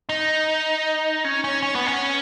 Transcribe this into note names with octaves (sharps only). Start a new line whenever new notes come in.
D#4
C#4
C#4
C#4
B3
C#4